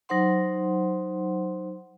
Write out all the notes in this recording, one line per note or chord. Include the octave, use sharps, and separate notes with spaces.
F#3 D#4 C5 F#5 C6